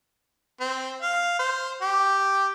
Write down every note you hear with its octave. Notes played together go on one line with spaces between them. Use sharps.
C4
F5
C5
G4